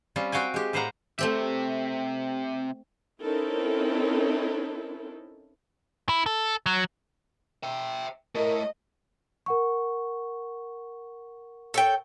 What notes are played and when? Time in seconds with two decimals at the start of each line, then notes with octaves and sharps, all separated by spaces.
0.16 G3 C4 C#4 F4
0.32 C4 F#4 F5 G5 G#5
0.54 G#3 G4
0.73 A2 B4 C5 F5 F#5 A#5
1.19 C3 A3 C4 G4 E5
3.22 C4 C#4 D#4 E4 A4 A#4
6.09 E4
6.26 A4
6.66 F#3
7.63 E5 G5
8.35 A3 E4 A#4 D#5
9.46 A#4 F#5 C#6
11.74 A4 C#5 G5